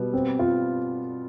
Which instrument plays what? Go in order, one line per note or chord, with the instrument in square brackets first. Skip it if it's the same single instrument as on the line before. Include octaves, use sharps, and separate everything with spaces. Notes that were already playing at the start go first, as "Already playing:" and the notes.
Already playing: [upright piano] B2 [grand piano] G3 B3
[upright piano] C4
F4